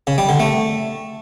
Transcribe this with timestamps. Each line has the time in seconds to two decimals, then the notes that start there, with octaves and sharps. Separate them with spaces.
0.07 C#3
0.18 G3
0.29 D3
0.40 A3